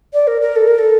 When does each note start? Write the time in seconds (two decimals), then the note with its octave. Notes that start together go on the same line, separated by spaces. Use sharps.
0.14 D5
0.27 A#4
0.41 A#4
0.56 A4
0.68 A#4
0.79 A4